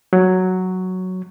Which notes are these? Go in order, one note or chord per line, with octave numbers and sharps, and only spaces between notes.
F#3